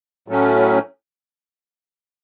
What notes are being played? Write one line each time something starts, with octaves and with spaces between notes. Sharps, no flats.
A2 F#3 A3 C#4